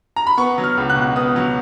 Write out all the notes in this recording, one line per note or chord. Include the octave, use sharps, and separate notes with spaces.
A#5
B5
B3 C#6
F#3
F6
C#2
F#6
B2
B3 D#6
F#3